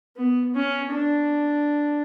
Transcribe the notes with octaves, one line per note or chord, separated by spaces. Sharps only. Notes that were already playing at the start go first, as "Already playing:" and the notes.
B3
C#4
D4